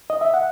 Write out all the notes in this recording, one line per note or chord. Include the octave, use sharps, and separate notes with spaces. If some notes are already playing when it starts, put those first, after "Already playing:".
D#5
E5
F#5